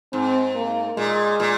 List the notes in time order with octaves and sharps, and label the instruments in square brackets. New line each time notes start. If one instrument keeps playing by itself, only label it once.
[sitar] G#2 [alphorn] C4
[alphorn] A#3
[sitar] A#2 [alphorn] G#3
[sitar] A#2